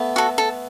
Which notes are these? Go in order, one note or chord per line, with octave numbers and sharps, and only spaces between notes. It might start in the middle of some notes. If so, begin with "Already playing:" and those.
Already playing: A3 B3
F#4 A4
A4